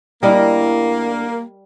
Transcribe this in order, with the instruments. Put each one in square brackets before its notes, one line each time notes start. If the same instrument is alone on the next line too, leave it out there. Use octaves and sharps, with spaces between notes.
[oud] D2 D4 E4 [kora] G3 A#4 D#5 [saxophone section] A#3